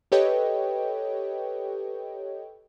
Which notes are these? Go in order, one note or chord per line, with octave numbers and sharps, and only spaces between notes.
G4 A4 B4 C#5 D#5 G5